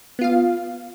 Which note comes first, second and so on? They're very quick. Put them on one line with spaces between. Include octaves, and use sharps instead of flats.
B3 F4 F5